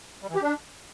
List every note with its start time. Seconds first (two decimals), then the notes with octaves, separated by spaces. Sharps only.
0.22 G3
0.29 E3
0.35 G4
0.42 D4